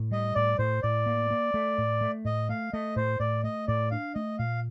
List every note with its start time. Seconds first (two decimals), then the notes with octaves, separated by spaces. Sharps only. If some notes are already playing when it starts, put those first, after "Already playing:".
Already playing: A2
0.11 G3 D#5
0.35 A2 D5
0.59 A2 C5
0.83 A2 D5
1.06 A#3
1.31 A#3
1.54 A3
1.78 A2
2.01 A3
2.25 A2 D#5
2.49 A3 F5
2.73 A3 D#5
2.96 A2 C5
3.20 A2 D5
3.44 A3 D#5
3.68 A2 D5
3.91 D4 F5
4.15 A3 D#5
4.39 A#2 F5